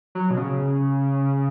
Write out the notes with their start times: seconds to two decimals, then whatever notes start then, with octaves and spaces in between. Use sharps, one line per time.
0.15 F#3
0.30 B2
0.37 C#3